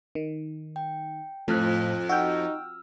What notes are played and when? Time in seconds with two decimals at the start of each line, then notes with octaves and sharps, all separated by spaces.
0.15 D#3
0.76 G5
1.48 F2 A2 F3 F4 F6 F#6
2.09 D#4 F#4 G5 E6 F6